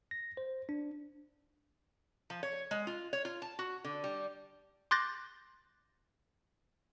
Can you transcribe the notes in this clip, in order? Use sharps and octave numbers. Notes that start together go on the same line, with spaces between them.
A#6
C5
D4
F3
C#5
G#3
F4
C#5
F4
A5
F#4
D3
G3
C6 D6 F#6 G6 A6 A#6